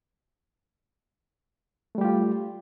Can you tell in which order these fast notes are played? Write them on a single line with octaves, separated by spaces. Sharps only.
A3 G3 G4 F4